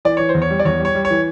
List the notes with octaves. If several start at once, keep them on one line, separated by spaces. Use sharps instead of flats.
E3 D5
E3 C#5
C5
E2
C#5
G3
D5
E2 C#5
G3
C#5
G3
C#5
E3